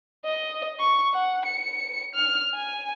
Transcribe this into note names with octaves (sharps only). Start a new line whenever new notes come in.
D#5
C#6
F#5
C#7
F6
G#5